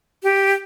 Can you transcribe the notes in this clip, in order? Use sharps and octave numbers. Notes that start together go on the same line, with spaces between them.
G4